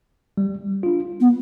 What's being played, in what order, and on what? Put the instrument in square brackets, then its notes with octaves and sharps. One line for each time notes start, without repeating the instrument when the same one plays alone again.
[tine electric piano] G3
D4 F4
[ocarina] B3